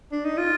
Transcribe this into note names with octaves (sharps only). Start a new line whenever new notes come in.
D4
D#4
F4